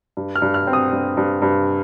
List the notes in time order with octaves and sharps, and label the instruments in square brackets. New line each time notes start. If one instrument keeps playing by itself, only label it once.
[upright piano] G2
F6
G2
F6
C4
D#6
G2
G2
G2